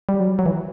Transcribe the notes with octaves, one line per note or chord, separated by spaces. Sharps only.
G3
F#3
F#3
E3